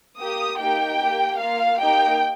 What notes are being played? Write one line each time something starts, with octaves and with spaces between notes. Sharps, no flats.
A#3 G4 D#6
A#3 D#4 G4 G5
A#3 G4
A#3 F4 F5
A#3 D#4 G4 G5